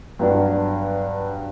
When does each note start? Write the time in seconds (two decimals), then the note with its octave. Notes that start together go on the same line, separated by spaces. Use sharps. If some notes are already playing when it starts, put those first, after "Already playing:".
0.19 G2 F#3 B3 D4